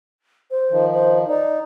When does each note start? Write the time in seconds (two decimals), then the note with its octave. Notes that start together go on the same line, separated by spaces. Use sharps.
0.51 C5
0.72 D#3 F3
0.94 C5
1.28 D#4 D5